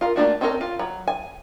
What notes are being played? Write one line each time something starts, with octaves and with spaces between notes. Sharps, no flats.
F4 A#4
A3 A#3 D4 F#4
C4 C#4 D#4 A4 A#4
F4
F#3
G#5